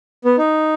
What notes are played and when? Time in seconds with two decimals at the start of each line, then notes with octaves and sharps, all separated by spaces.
0.25 B3
0.38 D#4